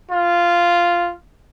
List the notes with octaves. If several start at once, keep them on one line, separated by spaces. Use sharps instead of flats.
F4